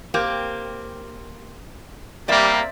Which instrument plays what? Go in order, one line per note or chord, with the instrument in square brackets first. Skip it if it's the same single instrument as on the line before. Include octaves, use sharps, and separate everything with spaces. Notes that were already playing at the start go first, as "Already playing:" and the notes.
[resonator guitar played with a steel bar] A#3 C4 G4
[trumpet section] G3 A#3 [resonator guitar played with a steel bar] C4 D5 E5